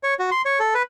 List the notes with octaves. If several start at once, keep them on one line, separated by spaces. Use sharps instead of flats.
C#5
F#4
C6
C#5
A4
B4